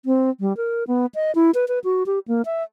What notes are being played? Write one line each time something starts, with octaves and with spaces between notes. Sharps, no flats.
C4
G3
A#4
B3
D#5
E4
B4
B4
F#4
G4
A#3
E5